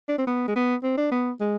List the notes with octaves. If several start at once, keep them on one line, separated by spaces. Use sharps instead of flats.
D4
C4
B3
G#3
B3
C4
D4
B3
G#3